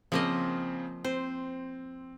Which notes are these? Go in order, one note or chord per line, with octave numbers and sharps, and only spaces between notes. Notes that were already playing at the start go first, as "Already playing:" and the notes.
C#3 F3 A#3 C4 D#5
C4 C5